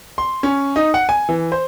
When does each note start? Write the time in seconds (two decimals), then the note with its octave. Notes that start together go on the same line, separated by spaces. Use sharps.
0.18 C6
0.43 C#4
0.76 D#4
0.94 F#5
1.09 G#5
1.29 E3
1.52 C5